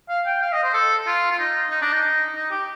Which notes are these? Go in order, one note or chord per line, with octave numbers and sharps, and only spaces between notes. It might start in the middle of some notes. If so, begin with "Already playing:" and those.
F5
G5
F5
D#5
C5
A4
F4
F4
D#4
D#4
D4
D#4
D#4
G4